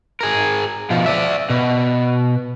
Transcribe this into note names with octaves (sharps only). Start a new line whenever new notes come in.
G#4 A#4
B2 F3
D5 E5
B2